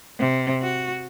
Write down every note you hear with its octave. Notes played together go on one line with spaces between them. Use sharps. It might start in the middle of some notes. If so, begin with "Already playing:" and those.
C3
F#4